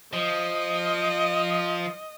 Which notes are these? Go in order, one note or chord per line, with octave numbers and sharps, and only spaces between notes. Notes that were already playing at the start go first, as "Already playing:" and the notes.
F3 D#5